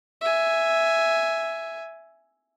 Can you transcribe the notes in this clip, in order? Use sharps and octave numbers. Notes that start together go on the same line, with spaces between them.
E5 G#5